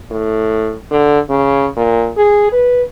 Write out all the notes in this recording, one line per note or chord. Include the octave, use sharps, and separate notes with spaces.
A2
D3
C#3
A#2
G#4
B4